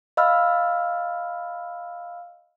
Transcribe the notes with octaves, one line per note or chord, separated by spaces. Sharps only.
D#5 F5 B5 E6 F6